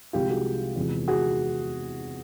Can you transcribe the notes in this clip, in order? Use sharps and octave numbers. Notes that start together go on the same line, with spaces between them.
C2 C3 F3 G#3 F4 G4
F#4 G#4
E2 C3 F3 G#3
F#4 G#4